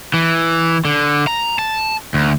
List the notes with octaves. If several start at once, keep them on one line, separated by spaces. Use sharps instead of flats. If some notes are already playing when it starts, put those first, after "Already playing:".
E3
D3
A#5
A5
D2